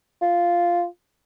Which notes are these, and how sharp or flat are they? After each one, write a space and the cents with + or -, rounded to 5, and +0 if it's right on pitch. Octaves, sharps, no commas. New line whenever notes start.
F4 -5